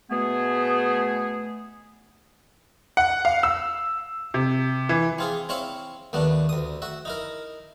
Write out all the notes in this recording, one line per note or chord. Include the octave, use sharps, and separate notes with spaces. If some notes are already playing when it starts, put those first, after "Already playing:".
B2 A3 B3 G#4
F#5
F5
E6
C3
E3
C4 F4 G#4
C4 E4 C#5 F5 B5
D#2 A3 B3 D4
D2 D#6
F#4 E5
D#4 E4 A#4